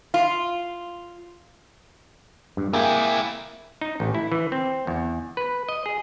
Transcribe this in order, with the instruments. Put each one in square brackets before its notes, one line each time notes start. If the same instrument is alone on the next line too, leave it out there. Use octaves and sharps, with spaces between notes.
[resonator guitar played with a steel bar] F4
[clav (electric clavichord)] G2
[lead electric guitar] C3 E4 [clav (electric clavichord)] A#3 G#4 G5
[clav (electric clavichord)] D#4
A1
E4
E3
C4
E2
B4
D#5
G#4